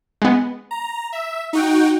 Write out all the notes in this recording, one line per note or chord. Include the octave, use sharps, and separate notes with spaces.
G#3 B3
A#5
E5
D#4 F#4 G5